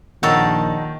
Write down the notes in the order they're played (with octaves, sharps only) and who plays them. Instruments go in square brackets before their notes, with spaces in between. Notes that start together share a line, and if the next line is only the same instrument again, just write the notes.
[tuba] A#1 [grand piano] D#3 [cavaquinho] D#4 C#5 A5 [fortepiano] F#5 E6